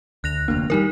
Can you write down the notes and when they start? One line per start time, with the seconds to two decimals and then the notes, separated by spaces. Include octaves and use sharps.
0.24 D2 F#6 A#6 F7
0.48 F1 D2 A#3 D4
0.70 D#3 F#3 G3 D#4 A#4